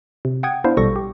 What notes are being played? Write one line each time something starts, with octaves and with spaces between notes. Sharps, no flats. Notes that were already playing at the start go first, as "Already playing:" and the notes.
C3
F#5 G5 D#6 G#6
B3 D4 E4 C5 F5
A#1 B2 G3 A4 C#6 A#6
G4